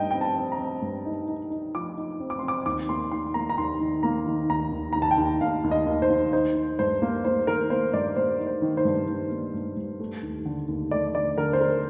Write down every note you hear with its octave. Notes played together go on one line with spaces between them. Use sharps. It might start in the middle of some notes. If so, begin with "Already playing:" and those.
Already playing: G2 D#4 D#5 G5
C4 G5
A5
C4
A#5
C4
G2
D#4
D#4
D#4
F3 D6
D#4
C4
D6
C4 C6
D6
D#2 D6
A#3 C6
D#3 C6
A#3 A#5
A#5
D#2 C6
D#3
A#3 A#5
D#3
D#2 A#5
D#2
D#2 A#5
A5
G5
D#2
D#2 F5
D#2
D#5
D#2
C5
D#2
D#4 C5
D#4
G2 C5
A#3
A#3 C5
D#3 A#4
A#3 C5
G2 D5
A#3 C5
D#4
C5
D#3
C5
G2
D#3
A#3
G2
G2
A3
D#2
D3
D#2
A3 D5
D3 D5
D3 A#4
C5
D4 A#4